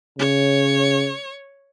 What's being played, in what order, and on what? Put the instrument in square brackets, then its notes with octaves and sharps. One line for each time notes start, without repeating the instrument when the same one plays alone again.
[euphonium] C#3 [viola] C#5